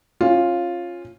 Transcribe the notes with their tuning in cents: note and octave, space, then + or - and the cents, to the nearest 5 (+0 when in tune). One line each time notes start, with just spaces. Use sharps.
C#4 -20 F4 +0